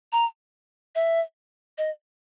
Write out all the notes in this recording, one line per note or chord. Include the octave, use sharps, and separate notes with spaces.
A#5
E5
D#5